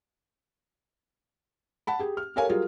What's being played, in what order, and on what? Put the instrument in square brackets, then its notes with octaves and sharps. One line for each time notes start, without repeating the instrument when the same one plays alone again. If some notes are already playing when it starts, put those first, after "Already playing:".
[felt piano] F#5 A5 B5
G4 G#4
F6
G4 A4 A#4 C#5 F5 G#5
F#3 G3 F4 G#4 A#4